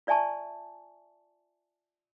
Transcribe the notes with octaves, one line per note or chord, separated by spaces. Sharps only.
F4 D5 E5 G#5 A5 C#6